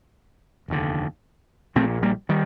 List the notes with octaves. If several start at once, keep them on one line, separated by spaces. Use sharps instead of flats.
F1 D#2 D3
A#1 A#2 A3 C4
G3 A#3
D#3 G3